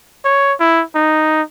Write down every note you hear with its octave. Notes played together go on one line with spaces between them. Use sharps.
C#5
E4
D#4